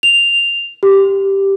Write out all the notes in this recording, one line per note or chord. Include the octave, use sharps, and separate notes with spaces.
F7
G4